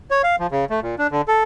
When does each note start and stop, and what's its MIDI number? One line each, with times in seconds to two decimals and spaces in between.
0.11 0.22 73
0.23 0.36 77
0.40 0.47 53
0.51 0.65 49
0.70 0.80 57
0.83 0.95 46
0.98 1.07 62
1.11 1.22 50
1.28 1.43 69